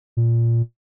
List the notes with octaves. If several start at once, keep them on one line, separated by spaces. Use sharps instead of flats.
A#2